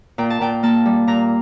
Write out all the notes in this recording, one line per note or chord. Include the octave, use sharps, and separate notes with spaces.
A#2 G5
A5
A#2 G5
A#3 A5
G3
A#2 A#5